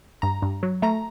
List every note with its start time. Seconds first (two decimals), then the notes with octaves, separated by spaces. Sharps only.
0.22 G2 A#5
0.42 G2
0.63 F#3
0.82 A3 A#5